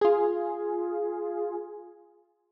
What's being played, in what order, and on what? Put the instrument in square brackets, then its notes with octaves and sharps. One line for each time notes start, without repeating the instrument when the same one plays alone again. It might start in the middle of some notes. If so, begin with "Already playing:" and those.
[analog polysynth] F4 G#4